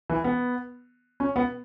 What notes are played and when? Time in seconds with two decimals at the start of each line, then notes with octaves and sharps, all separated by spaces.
0.10 E3
0.24 B3
1.20 C#4
1.36 B3